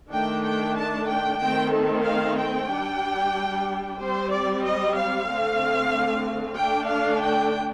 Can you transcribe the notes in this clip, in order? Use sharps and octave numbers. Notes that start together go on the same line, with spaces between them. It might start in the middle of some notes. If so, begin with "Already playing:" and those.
D#3 A3 D4 G5
G5
A5
G5
D#3 A3 C4 G5
A4
F5
G5
G3 D4
G3 C4 C5
D5
D#5
F5
D3 A3 C4
D3 A3 D4 G5
F5
G5